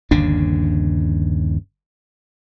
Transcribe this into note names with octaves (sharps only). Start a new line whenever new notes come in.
G1 D#2 C#3 D4